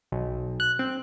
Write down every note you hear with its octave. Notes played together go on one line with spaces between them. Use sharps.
B1
F#6
C4